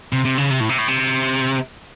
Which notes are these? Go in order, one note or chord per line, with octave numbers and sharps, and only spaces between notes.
C3
C3
C#3
C3
A2
C3
A2
C3